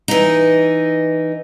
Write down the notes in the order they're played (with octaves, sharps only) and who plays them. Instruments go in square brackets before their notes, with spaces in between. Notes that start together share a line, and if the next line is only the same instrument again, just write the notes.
[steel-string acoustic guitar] E3 D#4